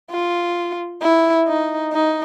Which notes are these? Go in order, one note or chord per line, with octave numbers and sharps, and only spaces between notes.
F4
E4
D#4
D#4